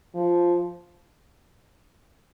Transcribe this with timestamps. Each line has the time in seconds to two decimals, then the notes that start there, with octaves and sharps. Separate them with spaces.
0.15 F3